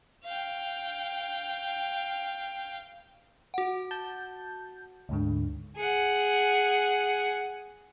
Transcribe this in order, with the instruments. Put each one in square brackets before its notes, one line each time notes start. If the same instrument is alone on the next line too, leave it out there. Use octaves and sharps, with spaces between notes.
[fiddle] F5 G5
[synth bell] F#4 F#5
[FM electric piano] A5 G6
D2 G#2 D3
[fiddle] G#4 F#5